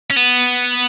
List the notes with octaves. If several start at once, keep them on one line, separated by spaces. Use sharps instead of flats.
C#4
B3